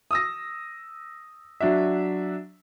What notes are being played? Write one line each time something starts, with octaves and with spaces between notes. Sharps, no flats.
D#6 E6 A#6
F#3 D4 F#4 E5